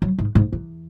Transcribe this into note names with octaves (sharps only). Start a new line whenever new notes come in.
F#3
G#2
G#2
E2